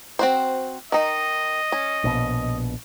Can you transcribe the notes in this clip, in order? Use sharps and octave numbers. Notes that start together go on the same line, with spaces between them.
C4 F#4 C5
D#3 D#4 D#5
C#4
A#1 B2